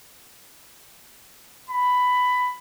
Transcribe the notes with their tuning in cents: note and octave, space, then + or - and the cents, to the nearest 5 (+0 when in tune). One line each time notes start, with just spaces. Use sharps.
B5 +10